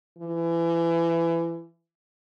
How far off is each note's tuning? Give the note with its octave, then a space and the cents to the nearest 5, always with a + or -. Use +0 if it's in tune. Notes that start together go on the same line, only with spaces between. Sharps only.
E3 +25